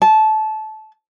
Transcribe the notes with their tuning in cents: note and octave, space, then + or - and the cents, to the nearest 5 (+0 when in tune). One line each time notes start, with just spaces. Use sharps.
A5 -20